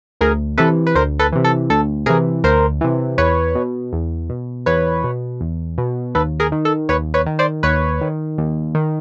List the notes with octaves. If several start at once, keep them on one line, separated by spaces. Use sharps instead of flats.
D2 G#4 A#4
C3 E3 A4 B4
B4
D2 A#4 C5
A4 B4
C3 E3
A4
D2 A4
C3 E3 G#4 A#4
D2 A#4 C5
C3 E3
E2 B4 C#5
B2
E2
B2
E2 B4 C#5
B2
E2
B2
D#2 A4 B4
G#4 A#4
D#3
A4
D#2 B4 C#5
B4 C#5
D#3
C5 D5
D#2 B4 C#5
D#3
D#2
D#3